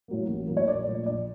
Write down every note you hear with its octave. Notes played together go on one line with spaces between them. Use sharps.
A2 F#3 A#3
A1
A2 F#3 A#3
C#5
A#1 D5
A#2 F3 A3
A#1 D5